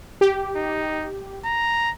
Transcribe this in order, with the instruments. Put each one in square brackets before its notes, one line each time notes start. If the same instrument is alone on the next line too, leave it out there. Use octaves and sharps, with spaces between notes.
[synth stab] G4
[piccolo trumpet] D#4
A#5